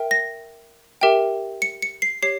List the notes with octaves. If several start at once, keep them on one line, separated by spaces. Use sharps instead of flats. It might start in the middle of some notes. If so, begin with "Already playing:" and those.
Already playing: A#4 E5 G5
A#6
G4 A#4 E5 G5
C#7
C#7
C7
G4 C#5 C7